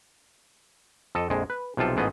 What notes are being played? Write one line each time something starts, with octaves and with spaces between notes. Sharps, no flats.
F2 A4 D#5
A#1 F2 G#3
B4
B1 C3 F3 F4 A4
A1 G#2 F3 B3 G#4 D#5